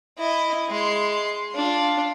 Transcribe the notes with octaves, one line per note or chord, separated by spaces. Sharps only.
E4 D#5
G#3 C6
D4 F4